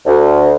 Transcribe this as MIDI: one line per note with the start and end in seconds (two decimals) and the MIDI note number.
0.06 0.56 38